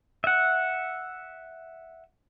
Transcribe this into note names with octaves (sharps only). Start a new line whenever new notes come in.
E5 F#5